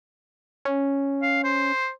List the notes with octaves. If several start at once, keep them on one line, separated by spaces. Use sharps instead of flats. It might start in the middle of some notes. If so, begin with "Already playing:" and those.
C#4
F5
C5